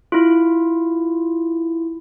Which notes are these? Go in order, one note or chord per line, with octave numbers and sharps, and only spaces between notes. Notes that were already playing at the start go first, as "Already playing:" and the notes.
E4 F4